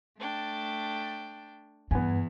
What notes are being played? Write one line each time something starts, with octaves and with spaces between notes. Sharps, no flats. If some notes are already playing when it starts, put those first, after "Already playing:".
A3 D4 G5
E2 G2 B3 G#5